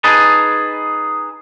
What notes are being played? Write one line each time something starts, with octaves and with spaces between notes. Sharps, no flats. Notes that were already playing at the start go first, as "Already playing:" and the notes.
D#4 G#4 B4 A5